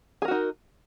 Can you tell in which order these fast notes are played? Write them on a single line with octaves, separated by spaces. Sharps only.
G#4 A#4 F#4 D#4